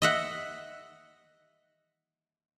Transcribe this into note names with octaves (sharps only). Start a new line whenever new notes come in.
D#5 E5 F#5